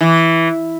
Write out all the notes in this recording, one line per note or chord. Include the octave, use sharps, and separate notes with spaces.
E3